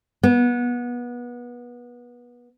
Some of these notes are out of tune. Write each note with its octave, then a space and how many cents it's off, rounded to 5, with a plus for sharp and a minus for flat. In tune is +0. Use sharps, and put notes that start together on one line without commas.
B3 -25